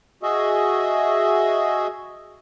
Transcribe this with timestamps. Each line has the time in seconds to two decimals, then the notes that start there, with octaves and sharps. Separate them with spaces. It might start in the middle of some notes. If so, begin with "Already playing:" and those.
0.23 F#4 G#4 D#5 E5